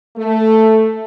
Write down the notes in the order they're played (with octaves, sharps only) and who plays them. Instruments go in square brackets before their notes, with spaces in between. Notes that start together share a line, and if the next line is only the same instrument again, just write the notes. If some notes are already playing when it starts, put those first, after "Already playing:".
[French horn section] A3